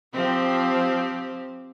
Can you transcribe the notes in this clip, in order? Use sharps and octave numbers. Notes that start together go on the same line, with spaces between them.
F3 C4 G4